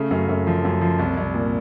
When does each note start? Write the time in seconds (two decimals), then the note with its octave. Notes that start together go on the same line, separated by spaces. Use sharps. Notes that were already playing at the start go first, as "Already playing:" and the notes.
Already playing: C#3 A3
0.11 F#2
0.29 F#2
0.47 F3
0.65 F#2
0.81 F3
0.99 C2
1.17 C2
1.34 A#2